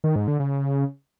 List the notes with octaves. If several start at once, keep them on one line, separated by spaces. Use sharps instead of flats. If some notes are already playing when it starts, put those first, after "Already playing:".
D#3
G#2
D3
C#3